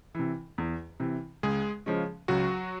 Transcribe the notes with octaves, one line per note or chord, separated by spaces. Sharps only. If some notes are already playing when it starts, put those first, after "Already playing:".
C3 E3
E2
C3 E3
C#2 G#3 G#4
C#3 F3 G#3 C#4
C#2 F#3 F#4